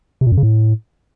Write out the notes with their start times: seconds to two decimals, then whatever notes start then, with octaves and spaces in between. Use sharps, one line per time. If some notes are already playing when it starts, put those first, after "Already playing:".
0.21 C3
0.27 A#2
0.32 F#2
0.37 C#3
0.43 A2